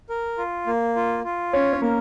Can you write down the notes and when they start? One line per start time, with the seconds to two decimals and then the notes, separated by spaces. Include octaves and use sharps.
0.10 A#4
0.38 F4
0.67 A#3
0.96 F4
1.24 F4
1.53 C#4 C#5
1.73 C#4
1.82 A#3 A#4